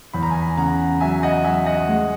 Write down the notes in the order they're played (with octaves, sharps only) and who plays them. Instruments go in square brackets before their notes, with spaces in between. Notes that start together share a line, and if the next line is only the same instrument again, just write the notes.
[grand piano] E2 B5
A#5
G#5 B5
C#3 F#5 A#5
F#3 E5 G#5
D#5 F#5
F#3 E5 G#5
D#5 F#5
G#3